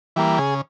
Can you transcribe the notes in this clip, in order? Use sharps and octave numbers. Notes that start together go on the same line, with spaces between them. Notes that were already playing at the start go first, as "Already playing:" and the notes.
E3 G3 A#3
C#3 G#4